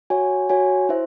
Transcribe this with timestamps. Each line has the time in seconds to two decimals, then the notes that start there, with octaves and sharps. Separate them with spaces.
0.10 F#4 C#5 G#5
0.49 F#4 C#5 G#5
0.89 E4 C5 E5